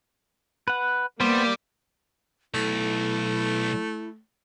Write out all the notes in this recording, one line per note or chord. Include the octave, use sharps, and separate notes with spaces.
B4 F#5
G3 A#3 B3 C5
B1 A3 E4